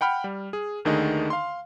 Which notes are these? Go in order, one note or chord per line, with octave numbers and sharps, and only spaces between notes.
F#5 G5 B5 F6
G3
G#4
D#2 D3 D#3 A3 G#4 D#5
F5 C6